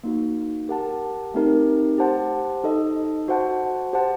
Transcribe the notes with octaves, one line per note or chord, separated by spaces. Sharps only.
A#3 D#4 F#4
G4 A#4 F#5 A5
A3 C4 D#4 G4 A#4
G4 C5 F#5 A5
D#4 A4 D#5
F#4 C5 F#5 A5
G4 C5 F#5 A5